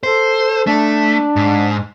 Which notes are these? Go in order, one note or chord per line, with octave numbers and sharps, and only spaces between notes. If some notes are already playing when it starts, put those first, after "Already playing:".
A4 C5
A3 D4
G#2